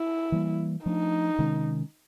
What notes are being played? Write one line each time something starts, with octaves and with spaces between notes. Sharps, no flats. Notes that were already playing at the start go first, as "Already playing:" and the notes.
Already playing: E4
E3 G3 A#3
F3 A3 D4 D#4
C3 D#3 G#3 C#4